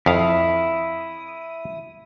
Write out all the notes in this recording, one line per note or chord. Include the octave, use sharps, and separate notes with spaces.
F2 E4 F5 D#6